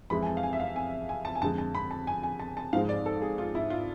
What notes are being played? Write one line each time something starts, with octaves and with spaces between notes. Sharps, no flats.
F2 E3 G#3 B5
G#5
A5
F5
G#5
E5
F5
G#5
G#5
A5
G#5
F2 D3 G#3 A5
A5
B5
A5
G#5
G#5
A5
A5
G#2 F3 G#3 F5
D5
A4
G#4
F4
E4
F4